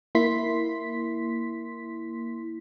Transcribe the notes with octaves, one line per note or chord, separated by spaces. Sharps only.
A#3 E4 C6 B6